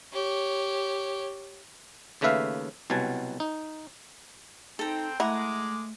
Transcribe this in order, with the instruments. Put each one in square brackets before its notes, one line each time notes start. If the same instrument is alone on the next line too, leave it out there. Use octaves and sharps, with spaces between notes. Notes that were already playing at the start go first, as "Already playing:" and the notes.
[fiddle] G4 C#5
[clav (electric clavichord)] D#2 C#3 A3 B4 E5 F5
C2 B2 F#3 G#5 A5
D#4
[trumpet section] C4 G5 [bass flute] D#4 [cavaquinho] A4 A#5
[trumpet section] G#3 D6 [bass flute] A3 [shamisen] E4 [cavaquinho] F#5 A#5